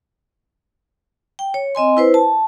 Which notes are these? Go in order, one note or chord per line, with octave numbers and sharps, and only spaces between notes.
G5
C#5
C4 D#5 G#5 C6
E4 B4 C5
A5